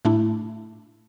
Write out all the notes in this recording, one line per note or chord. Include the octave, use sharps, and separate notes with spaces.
A2 A3 D4 E4